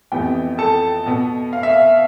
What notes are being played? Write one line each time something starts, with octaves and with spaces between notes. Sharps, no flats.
F2 E3 B3 G4 G5
A4 A5
B2 B3
F5
E5
F5